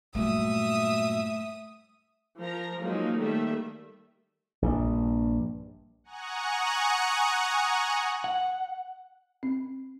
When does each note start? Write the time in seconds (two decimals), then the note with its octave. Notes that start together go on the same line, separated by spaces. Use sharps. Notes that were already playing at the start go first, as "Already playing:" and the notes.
0.15 G2 A#2 F#3 G3 A3 E5 D#6
2.39 F3 A#4 A#5
2.80 F3 F#3 G#3 A#3 C4 D#4
3.18 D#3 G3 A3 A#3 A4 E5
4.62 A#1 G2
6.04 F#5 G#5 A#5 C#6 D#6 F#6
8.24 F#5
9.43 C4